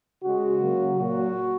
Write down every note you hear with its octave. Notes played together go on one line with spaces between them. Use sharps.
C#3 G#3 F#4
C#3 F#3 A#3
A#2 F#3 A#3 F#4